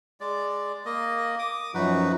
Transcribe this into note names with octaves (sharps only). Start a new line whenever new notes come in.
G#3 D5
A#3 D#5
D6 D#6
F#2 F3 D#4 F#4 B4